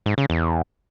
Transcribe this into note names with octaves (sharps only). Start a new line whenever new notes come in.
G#2
C#3
E2